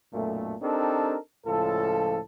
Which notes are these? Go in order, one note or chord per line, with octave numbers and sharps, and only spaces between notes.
B1 F#2 A#2 A3
C4 D4 D#4 G4 A4 A#4
C#2 A2 F3 F4 A4